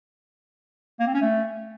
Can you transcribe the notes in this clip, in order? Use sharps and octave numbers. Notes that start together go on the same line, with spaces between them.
A#3
C4
C#4
A3